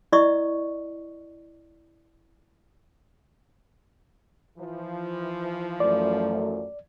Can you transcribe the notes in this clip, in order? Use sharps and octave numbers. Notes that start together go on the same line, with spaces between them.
E4 D5 D#5 C#6 D#6
E3 F3
F#2 A3 D5